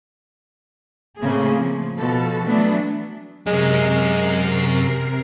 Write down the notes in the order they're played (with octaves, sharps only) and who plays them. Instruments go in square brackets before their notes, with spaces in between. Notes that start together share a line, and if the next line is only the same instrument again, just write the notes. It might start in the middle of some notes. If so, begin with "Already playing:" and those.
[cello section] A2 C#3 A3 A#3 C4 G#4
F3
B2 F3 A4
E3 F#3 A3 B3 D4
[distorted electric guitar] F#2 [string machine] C3 A#4 C7 [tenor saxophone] G#3